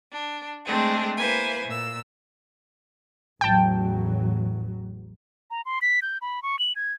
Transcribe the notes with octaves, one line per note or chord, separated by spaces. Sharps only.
D4
G#3 A3 C4 D4 G#4
A#3 E4 B4 C5 G#5
A#2 E6
A1 E2 F#3 G5 A5
A#5
C6
B6
G6
B5
C#6
F#7
G#6